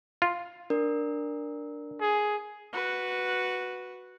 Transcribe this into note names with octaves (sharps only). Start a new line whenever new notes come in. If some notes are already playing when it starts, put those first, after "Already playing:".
F4
D4 A#4
G#4
F#4 B4